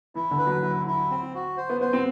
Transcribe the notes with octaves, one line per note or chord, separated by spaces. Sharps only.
E3 E4
D3
B4
F#3
E4
E4
C4
F#4
C5
B3
B3 C5
C4